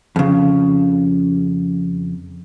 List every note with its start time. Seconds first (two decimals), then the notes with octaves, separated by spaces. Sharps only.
0.16 F2 C#3